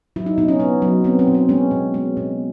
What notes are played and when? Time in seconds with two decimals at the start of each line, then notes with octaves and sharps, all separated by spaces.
0.16 F#3 E4
0.26 D#4
0.38 B2 D#4
0.48 C#4
0.60 B2 B3
0.82 F#3
1.04 B3 C4
1.19 C4
1.27 B2
1.35 C4
1.49 G#3 C#4
1.71 B2
1.94 G#3
2.17 B2